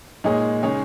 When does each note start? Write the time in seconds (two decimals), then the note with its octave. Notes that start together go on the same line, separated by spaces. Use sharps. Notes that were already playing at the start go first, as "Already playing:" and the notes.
0.24 A#2 G#3 D#4 G#4 C#5
0.63 C#3 G#3 D#4 G#4 C#5